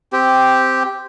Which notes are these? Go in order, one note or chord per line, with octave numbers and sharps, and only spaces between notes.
C4 G4